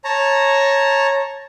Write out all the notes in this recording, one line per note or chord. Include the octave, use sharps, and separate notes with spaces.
C#5 A5 A#5